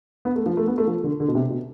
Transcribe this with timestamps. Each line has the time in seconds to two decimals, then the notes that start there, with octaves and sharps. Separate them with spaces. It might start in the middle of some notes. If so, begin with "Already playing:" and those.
0.25 B3
0.36 A3
0.46 F3
0.57 A3
0.67 B3
0.78 A3
0.87 F3
1.04 D3
1.20 D3
1.28 B2
1.35 C3
1.50 B2